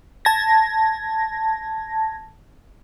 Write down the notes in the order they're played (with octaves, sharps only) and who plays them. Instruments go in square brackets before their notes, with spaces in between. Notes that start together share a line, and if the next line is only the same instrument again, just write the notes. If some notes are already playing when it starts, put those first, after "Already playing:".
[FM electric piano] A5 G#6 A#6